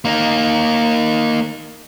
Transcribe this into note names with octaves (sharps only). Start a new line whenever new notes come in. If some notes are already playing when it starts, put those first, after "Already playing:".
A#3 D#4